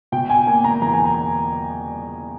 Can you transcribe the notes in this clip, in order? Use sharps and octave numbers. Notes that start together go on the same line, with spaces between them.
B2 G5
G#5
A#3 G#5
A#5
E2 A#5
G#5
A#5